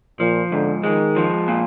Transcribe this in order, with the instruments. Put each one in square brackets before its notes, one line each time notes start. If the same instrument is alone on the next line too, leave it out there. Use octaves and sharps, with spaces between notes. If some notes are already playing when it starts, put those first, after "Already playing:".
[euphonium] A#2 [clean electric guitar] F3
[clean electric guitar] G#2 [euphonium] D3
[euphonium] D#3 [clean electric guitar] G#3
[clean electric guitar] F3
A#2